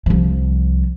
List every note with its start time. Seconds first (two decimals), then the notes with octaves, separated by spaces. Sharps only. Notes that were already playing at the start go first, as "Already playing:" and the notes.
0.06 C2 F3